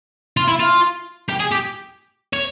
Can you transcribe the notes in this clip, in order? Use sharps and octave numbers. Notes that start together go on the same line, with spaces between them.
F4
E4
F4
G4
G#4
G4
C#5